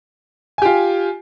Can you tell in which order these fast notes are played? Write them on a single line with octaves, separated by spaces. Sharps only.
G#5 G4 F4